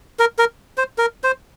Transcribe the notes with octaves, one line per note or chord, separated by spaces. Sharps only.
A#4
A#4
C5
A#4
C5